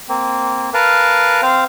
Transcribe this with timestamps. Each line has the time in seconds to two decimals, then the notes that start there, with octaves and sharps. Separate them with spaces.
0.09 A#3 C4
0.74 A#4 B4 F5 A5
1.43 C4 C5 F5